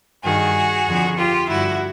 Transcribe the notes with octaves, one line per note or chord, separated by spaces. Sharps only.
G2 D#3 F#4 G#4
F2 D3 F3
F4 G4
G2 D3 F3 E4 F#4